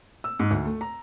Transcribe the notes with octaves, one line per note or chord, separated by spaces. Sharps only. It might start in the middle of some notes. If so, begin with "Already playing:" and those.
E6
G#2
D2
A3
A#5